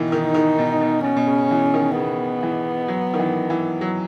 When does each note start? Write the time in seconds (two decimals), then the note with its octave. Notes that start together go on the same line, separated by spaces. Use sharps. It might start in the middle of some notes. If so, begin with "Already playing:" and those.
Already playing: B2 D#3 E3
0.12 D#3 D#4
0.34 D#3
0.59 B2
0.81 B2
1.04 B2 C#4
1.17 B2
1.27 C#3
1.51 E3
1.74 D#3
1.96 C#3 B3
2.43 E3
2.88 F#3
3.14 D#3
3.19 E3
3.50 E3
3.81 F#3